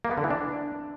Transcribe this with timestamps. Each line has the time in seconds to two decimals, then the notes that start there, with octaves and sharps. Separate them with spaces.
0.05 A#3
0.11 B3
0.18 D3
0.24 E3
0.31 D4